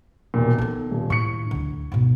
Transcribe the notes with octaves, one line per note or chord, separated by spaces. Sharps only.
E1 D#2 A#2
B3 D#4 A4
D#1
A2 C#6 C#7
D2 D3
G#2 B2